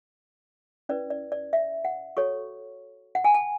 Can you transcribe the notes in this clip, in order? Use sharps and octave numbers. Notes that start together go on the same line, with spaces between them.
C#4 E4 B4 D5
D5
D5
E5
F#5
F#4 A4 C#5 C#6
F#5
G#5
A5